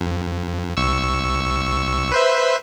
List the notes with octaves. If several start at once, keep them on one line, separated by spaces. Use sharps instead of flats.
F2
C2 C#6 E6
B4 C5 E5